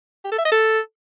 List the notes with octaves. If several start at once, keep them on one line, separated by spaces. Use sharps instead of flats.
G4
A4
E5
D#5
A4